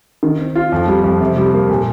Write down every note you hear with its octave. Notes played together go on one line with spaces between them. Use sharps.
D#3
C4
F4
F2
G3
F2
C3
G3
A#3
A#2